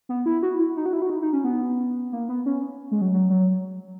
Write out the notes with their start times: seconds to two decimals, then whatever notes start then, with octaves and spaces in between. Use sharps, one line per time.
0.09 B3
0.26 E4
0.43 F#4
0.59 E4
0.77 D#4
0.86 F#4
0.93 E4
1.02 F#4
1.10 D#4
1.22 D#4
1.33 C#4
1.44 B3
2.12 A#3
2.29 B3
2.46 C#4
2.91 G#3
3.01 F#3
3.13 F#3
3.30 F#3